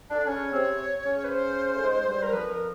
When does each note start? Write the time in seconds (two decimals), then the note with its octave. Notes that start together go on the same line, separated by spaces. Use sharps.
0.10 D3 D4 D5
0.20 D4
0.27 C#3 C#4 C#5
0.53 C3 C4
1.04 C#3 C#4
1.24 B4
1.30 C5
1.75 A3
1.81 G#2 G#3
1.99 G#3
2.07 G2 G3
2.23 A#4
2.32 F2 F3 B4
2.50 A#4